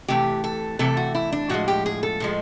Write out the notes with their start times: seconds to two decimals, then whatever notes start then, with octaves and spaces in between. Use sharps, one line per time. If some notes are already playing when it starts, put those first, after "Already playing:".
0.08 C3 E3 A3 G4
0.44 A4
0.79 C3 E3 A3 A4
0.97 F#4
1.15 E4
1.32 D4
1.49 A2 F3 G#3 F#4
1.68 G4
1.86 G#4
2.03 A4
2.20 A2 F3 G#3